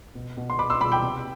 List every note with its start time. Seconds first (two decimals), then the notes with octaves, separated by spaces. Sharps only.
0.15 B2
0.37 B2
0.50 C6
0.59 B2 B5 D6
0.70 C6 E6
0.80 B2 B5 D6
0.92 G5 B5
1.02 C3